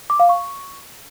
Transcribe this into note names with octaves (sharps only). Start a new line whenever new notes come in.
D6
F5
C#6